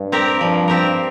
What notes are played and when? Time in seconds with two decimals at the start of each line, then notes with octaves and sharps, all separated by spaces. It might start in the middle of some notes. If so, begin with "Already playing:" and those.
Already playing: G2
0.12 C4 G4 A#4
0.41 G2 F3
0.68 C4 G4 A#4